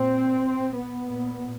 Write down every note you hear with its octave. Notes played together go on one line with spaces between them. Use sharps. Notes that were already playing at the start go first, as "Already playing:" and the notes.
Already playing: A#2 C4
B3
A#2